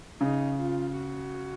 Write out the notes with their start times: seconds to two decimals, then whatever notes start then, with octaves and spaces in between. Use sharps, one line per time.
0.21 C#3 D#4
0.59 F4
0.97 F#4